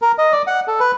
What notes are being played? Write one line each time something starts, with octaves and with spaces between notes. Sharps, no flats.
A#4
D#5
D5
F#5
A4
B4